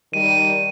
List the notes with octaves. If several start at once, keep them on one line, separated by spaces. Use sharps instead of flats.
D#3 G3 D#7